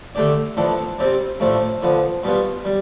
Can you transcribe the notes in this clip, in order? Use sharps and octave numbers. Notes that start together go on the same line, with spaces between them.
D3 A3 D4 G4 D5
A2 F3 B3 D4 A4
C3 G3 C4 G4 D5
A2 F3 A3 D4
D3 F3 B3
B2 G3 B3 F4
G3